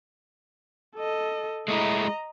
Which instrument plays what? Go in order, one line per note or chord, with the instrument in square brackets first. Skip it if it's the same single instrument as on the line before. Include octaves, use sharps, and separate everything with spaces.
[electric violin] A4 D#5
[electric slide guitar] G#3 A3 E4 [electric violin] D#5 A#5